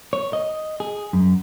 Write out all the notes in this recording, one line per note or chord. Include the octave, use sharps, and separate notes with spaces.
C#5
D#5
G#4
F#2